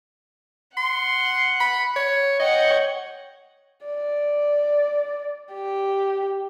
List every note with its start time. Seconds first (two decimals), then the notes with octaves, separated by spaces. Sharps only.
0.77 F#5 C6
1.60 B5
1.96 C#5
2.39 C#5 D#5 F#5 G5
3.86 D5
5.53 G4